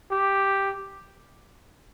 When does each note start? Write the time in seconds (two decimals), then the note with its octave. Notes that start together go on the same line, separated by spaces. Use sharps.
0.11 G4